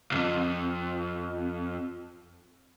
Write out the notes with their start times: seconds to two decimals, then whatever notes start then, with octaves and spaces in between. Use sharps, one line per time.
0.11 B1 F2